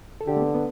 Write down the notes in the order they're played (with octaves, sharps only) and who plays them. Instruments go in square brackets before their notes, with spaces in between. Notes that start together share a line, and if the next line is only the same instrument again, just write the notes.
[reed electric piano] A4
[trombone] D3 [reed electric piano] G4
[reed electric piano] A3
B3
B3